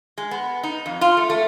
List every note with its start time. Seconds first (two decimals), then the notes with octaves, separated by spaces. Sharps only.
0.18 G#3
0.31 B3
0.63 D#4
0.86 F2
1.01 F4
1.17 A3
1.30 A3